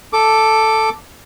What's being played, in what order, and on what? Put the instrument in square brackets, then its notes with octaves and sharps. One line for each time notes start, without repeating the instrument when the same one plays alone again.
[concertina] A4 D6